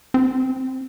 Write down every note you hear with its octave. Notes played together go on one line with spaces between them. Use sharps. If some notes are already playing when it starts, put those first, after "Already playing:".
C4